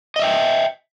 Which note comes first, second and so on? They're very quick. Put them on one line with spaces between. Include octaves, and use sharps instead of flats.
D#5 E5 G5